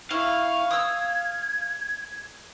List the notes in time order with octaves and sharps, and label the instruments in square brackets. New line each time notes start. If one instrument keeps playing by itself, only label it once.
[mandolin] E4 [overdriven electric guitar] F5 [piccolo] C#6
[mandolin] D#6 E6 [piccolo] G#6